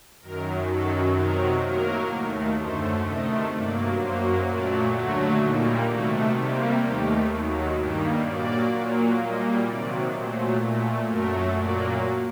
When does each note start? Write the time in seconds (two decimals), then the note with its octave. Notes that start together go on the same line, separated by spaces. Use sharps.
0.21 F#2 D#3 F#3 A#4
0.69 F#2 D#3 F#3 A4
1.16 C3 D#3 F#3 A#4
1.63 A2 F#3 A#3 A#4
2.10 D#2 D#3 A3
2.57 F#2 D3 A3 C5
3.05 C3 D#3 A3 D#5
3.52 G2 F#3 A#3 D5
3.99 F#2 F#3 A#3 C5
4.46 A#2 F#3 A3 D5
4.93 D#2 D3 F#3 A3 F#4
5.41 A#2 G3 A#3 D#4
5.88 C3 D#3 A3 F#4
6.35 C3 G3 A#3 G4
6.82 D#2 D#3 A3 G4
7.30 D#2 D#3 F#3
7.77 G2 D#3 G3 A#3 G4
8.24 A#2 F#3 A#3 D5
8.72 A#2 F#3 A#3
9.18 A#2 G3 A#3 D#5
9.66 C3 D#3 F#3 D5
10.13 A#2 F#3 A3 C5
10.60 A#2 A3
11.08 F#2 F#3 A3 A#4
11.55 A#2 F#3 A#3 D5